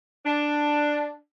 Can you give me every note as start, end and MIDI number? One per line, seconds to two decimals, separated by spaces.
0.25 1.16 62